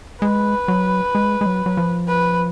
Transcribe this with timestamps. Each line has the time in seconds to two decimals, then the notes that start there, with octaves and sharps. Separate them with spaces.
0.22 G#3 B4
0.68 F#3
1.15 G#3
1.41 G#3
1.46 F#3
1.66 F#3
1.77 F3
2.08 B4